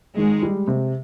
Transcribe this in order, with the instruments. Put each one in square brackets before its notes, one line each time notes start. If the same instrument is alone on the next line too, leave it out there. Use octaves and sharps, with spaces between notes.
[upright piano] D#3 [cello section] G#3
[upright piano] G3
C3